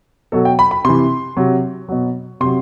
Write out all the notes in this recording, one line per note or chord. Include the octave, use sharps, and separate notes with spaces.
B2 F#3 A4
G5
B5
B5
C3 E3 C6
C3 F#3
B2 F#3
C3 F#3 C6